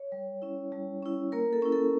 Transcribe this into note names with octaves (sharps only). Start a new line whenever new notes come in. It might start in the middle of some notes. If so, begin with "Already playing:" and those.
Already playing: C#5
G3
C#4 E4
G3
C#4 E4
A#3 A#4
A4
C#4 E4
A4